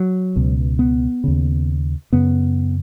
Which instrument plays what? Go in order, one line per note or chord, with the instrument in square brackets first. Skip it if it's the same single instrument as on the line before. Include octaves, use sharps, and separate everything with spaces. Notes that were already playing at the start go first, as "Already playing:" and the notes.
Already playing: [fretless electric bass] F#3
C#2 B2
B3
D#2 C#3
F#2 C#3 B3